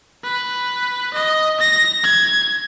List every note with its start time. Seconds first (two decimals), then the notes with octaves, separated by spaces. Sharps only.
0.24 B4
1.14 D#5
1.60 A#6
2.03 G#6